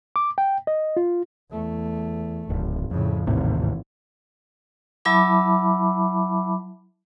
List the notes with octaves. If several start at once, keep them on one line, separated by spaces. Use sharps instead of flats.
D6
G5
D#5
F4
E2 A3
D1 G#1
F2 A2 C#3
G#1 D#2 A2 C3 E3
F#3 E4 E5 A5 B5 D6